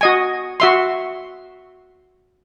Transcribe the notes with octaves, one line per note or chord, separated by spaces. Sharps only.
F#4 D#5 G#5
F#4 E5 C6